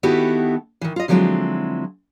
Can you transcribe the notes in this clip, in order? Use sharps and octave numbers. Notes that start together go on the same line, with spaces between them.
D#3 B3 E4 F#4 G4 A4
D#3 E3
F4 D#5
D3 F3 F#3 G#3 C4 E4